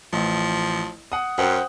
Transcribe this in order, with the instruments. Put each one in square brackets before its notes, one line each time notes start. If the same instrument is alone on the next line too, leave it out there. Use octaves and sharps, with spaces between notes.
[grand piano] A1 [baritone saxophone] F3
[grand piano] F#5 D#6
[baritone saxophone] F#2 [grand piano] C5 F#5 G5